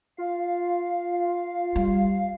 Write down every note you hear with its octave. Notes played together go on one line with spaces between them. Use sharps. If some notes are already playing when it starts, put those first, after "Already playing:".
F4 F5
F5
G3